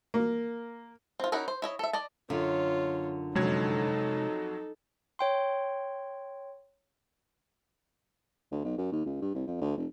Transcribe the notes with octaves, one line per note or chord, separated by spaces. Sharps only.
A#3
C4 F4
C#4 D#4 E4 F#4 A#4
C5
E4 C#5 D#5
A4 E5
D5 D#5 A5
F#2 D3 F4 C#5
F2 C3 F#3 G#3 D#4 A4 G#6
C#5 G5 C6
D2
B1
F#2
D#2
C#2
G2
C2
F2
D2
F1